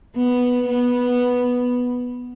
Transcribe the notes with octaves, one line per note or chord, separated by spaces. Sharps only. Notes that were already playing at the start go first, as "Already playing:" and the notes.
B3
B3